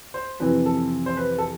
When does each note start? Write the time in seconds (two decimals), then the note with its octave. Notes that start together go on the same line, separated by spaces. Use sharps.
0.14 C5
0.40 F2 C3 E3 B4
0.66 A4
1.06 C5
1.17 B4
1.38 A4